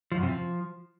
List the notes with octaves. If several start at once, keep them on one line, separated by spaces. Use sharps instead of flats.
F3
F#2
C3
F3